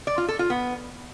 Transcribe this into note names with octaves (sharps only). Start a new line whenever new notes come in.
D5
F4
A4
F4
B3